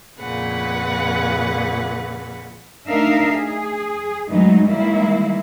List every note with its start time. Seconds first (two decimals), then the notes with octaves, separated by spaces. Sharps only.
0.18 F2 A#2 C#3 B4 F#5
2.88 A3 D4 D#4 A#4 E5 F5
3.33 G#4
4.30 F#2 E3 F#3 G#3 A3 D#4
4.67 D#3 E3 G3 G#3 A#3 E4